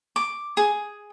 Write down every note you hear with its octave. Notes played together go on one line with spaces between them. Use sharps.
D6
G#4